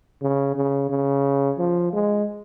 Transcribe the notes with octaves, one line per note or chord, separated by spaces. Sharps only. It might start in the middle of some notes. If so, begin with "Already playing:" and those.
C#3
C#3
C#3
F3
G#3